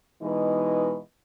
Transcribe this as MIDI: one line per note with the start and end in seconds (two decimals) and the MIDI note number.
0.22 0.98 47
0.22 0.98 52
0.22 0.98 56
0.22 0.98 63
0.22 0.98 71